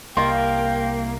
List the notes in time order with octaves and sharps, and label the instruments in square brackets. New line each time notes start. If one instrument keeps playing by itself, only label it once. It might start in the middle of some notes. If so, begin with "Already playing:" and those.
[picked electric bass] C2 [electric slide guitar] A#3 [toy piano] D#5 C6 [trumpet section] F5 G5